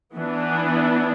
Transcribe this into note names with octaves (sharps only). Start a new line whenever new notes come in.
E3 B3 D4